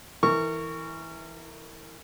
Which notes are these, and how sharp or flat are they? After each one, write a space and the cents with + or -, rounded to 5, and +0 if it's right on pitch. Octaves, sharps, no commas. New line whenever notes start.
E3 -10 A#4 -30 C#6 +0